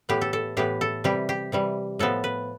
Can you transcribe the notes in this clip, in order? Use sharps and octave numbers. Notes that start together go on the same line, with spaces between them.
A2 E3 B3 G4
A4
A4
A2 E3 B3 G4
A4
C3 E3 G3 G4
G4
C3 E3 G3
A2 F3 B3 A4
B4